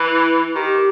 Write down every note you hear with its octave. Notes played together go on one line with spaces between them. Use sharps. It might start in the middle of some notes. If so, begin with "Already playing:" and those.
Already playing: E3
E4
D#3 G4